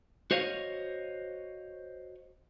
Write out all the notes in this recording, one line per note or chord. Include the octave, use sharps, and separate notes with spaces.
F#4 C5 C#5 D#5 F5